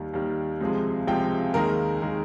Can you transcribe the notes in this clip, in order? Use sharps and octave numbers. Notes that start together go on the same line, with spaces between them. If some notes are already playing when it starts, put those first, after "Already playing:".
Already playing: D#2 D#3 G3
D#2 D#3 G3
C#2 C3 F3 G#3
C#2 C3 F3 G#3 G5
D#2 D#3 G#3 A#4
D#3 G#3